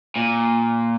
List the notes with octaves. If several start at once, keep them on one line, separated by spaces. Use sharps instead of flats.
A#2